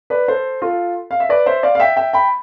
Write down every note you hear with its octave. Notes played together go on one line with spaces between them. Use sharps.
B4 D5
A4 C5
F4 A4
F5
E5
B4 D5
C5 E5
D5 F5
F5
E5 G5
E5 G5
G5 B5